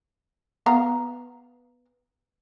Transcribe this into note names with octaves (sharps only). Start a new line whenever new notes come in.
B3 F5 A#5